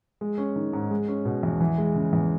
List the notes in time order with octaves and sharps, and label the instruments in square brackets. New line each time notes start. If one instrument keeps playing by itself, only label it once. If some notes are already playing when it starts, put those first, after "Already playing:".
[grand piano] G#3
C#4
D#3
G#2
G#3
C#4
B2
E2
E3
G#3
C#3
E2